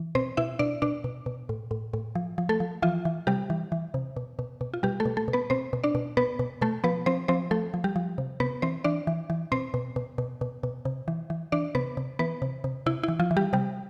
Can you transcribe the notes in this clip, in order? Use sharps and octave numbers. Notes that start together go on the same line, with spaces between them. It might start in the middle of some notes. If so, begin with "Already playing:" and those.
Already playing: E3
B2 C4 C5
B2 E4 E5
B2 D4 D5
B2 D4 D5
B2
B2
A2
A2
A2
F3
F3
A3 A4
F3
E3 F3 F4
E3
C3 G3 G4
E3
E3
C3
B2
B2
B2
F4
B2 G3 G4
A3 A4
B2
A3 A4
B2
B3 B4
B2 C4 C5
B2
D4 D5
B2
B2 B3 B4
B2
B2 A3 A4
F3 B3 B4
F3 C4 C5
F3 C4 C5
F3 A3 A4
F3
G3 G4
F3
C3
C3 B3 B4
E3 C4 C5
E3 D4 D5
E3
E3
B2 C4 C5
B2
B2
B2
B2
B2
C3
E3
E3
E3 D4 D5
C3 B3 B4
C3
E3 B3 B4
C3
C3
C3 E4
E3 E4
F3 F4
E3
G3 G4
C3 G3 G4